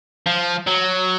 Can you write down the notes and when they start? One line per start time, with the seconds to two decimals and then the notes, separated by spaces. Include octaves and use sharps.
0.26 F3
0.67 F#3